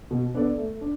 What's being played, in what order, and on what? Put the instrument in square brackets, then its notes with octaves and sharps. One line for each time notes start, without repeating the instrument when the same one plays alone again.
[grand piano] B2
B3 D4 A4 D5
A3
D4